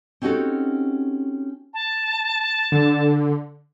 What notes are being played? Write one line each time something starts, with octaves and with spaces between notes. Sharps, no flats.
C4 C#4 D#4 F#4 G4 A4
A5
D3